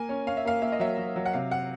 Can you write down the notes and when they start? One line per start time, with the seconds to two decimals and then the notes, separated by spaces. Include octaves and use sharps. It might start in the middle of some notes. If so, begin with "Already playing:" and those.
Already playing: A#3 G#5
0.09 C#4
0.27 C#4 F5
0.37 E5
0.45 A#3 F5
0.62 A#3 E5
0.72 D#5
0.80 F#3 E5
0.98 F#3
1.16 F#3
1.26 F#5
1.33 C3 F5
1.51 F#5